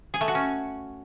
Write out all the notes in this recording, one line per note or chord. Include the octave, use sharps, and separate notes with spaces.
G#4
A3
F#4
C#4